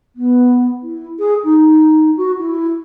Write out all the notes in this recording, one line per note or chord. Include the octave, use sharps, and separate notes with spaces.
B3
E4
G#4
D#4
F#4
E4